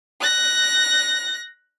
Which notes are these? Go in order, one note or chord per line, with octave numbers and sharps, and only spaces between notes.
F#6 A#6